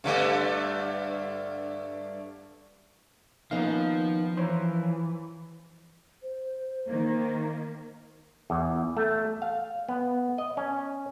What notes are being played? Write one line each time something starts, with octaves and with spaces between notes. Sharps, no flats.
G2 D3 A3
D#3 F3 A#3 B3 C#4 D#4 F5
F#2 E3 C5 C#5 A#5
C5
D#3 A#3
E2
A3
F5
B3
D#5
C#4